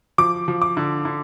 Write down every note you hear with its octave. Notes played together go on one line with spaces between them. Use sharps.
F3 D6
F3
D6
D3
D3